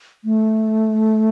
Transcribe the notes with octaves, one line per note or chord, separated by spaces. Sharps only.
A3